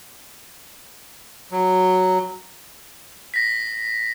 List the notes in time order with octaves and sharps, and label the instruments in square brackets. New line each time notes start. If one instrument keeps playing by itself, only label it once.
[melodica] F#3
[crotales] A#6 B6